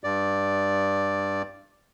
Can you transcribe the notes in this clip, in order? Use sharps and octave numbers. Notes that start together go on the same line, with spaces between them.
G2 D5